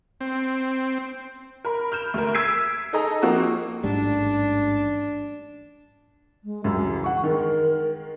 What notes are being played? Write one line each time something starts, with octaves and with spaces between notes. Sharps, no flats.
C4
A#4 B5
F6 G6 E7
D2 A#4
E6 G#6 B6 C7 D7 D#7
D#4 G#4 A4 D#5 A#5
F3 A#3 C4 F#4
A1 G#2 G3 D4
G#3
C#2 F#2 F#3 G3
E3
F#5 C#6
D#3 G#3 A#4